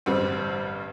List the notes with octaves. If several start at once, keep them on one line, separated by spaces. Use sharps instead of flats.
A1 G2 D3 G3 C4